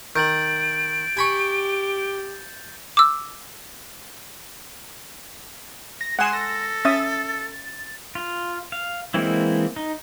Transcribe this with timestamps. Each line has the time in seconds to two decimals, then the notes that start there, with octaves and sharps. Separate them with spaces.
0.16 D#3 G6 A6 D7 F#7
1.17 G4 G#5 B5 C#6
2.97 D6 E6
6.01 A#6
6.19 G#3 G#4 F#5 G#5 C6 E7
6.33 A4 A#6
6.85 C#4 E5 D#6 A6
8.15 F4
8.72 F5
9.14 E3 G#3 A#3 C4 E4
9.76 D#4